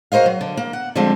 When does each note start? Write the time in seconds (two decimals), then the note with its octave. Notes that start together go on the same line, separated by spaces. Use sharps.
0.12 F#4 A#4 C5 D#5 F5
0.26 F#3
0.41 D3
0.57 A#3
0.73 F#5
0.95 D3 F3 G3 G#3 C4 A5